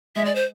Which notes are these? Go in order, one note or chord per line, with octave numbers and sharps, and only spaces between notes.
G#3 E5
D5
C5